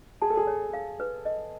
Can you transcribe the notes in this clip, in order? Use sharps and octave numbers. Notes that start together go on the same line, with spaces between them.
G#4 A5
A4
G#4
C#5
F5
B4
D#5